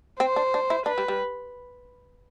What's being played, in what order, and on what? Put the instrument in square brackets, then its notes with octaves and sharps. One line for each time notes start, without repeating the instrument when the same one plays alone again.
[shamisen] C4 [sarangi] C5
[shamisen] D4
D4
E4
[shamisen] D4 [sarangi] B4
[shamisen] G3
G3